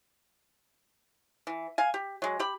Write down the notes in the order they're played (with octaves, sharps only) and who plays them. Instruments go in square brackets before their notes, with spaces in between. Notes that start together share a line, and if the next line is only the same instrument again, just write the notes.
[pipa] E3
F5 G#5
G4
F#3 G#3
G4 B5